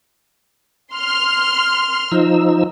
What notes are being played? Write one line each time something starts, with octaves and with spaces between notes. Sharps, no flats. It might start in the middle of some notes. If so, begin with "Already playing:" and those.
C6 F6
F3 D#4 E6